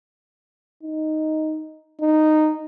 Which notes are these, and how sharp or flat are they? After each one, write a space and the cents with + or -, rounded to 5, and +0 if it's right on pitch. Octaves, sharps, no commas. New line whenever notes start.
D#4 +0
D#4 -10